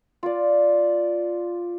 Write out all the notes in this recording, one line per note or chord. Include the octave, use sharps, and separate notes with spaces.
F4 D5